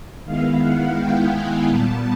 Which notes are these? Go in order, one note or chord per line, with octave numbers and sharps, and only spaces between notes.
D#3 G#3 B3 E4 F5
F#5
G5
G#5
A#2 G3 B3 A5